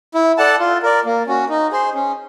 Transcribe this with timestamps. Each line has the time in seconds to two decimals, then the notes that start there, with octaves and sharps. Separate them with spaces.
0.14 E4
0.38 A4 D5 F#5 A5
0.60 F4
0.83 A#4 D5
1.05 A#3
1.27 C#4 F#4
1.49 D#4
1.71 G#4 C5
1.94 C#4